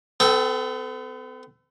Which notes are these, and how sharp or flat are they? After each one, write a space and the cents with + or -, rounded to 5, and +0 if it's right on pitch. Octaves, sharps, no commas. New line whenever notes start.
B3 +45 A4 +0 G5 +0